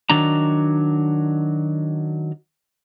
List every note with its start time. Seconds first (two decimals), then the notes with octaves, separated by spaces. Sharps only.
0.10 D#3 F#3 D4 A#5